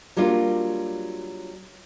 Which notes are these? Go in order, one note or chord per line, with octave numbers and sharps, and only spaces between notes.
F#3 G3 A#3 D4 F4